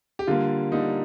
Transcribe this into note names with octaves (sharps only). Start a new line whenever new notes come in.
G4
D3 G3 A#3 F4
D3 G3 A#3 D#4